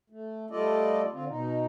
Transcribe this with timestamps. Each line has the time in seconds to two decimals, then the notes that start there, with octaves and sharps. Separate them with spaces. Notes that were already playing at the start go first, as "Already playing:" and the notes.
0.10 A3
0.50 G3 A3 F4 A4 D5 D#5
1.12 D3 C4 F4
1.28 B2 D#4